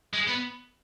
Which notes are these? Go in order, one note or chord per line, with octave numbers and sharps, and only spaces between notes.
G#3
B3